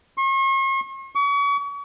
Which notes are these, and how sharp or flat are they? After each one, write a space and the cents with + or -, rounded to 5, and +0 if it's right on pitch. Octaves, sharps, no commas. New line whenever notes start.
C#6 -45
C#6 +40